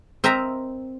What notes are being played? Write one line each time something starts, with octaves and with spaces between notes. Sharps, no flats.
C4 A#4 D#5 E5 A#5